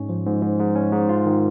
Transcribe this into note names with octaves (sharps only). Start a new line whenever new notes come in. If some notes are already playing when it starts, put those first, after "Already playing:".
Already playing: G#2 C#4
F3
G#2
G#2
G#2
C#4
G#2
F4
D#3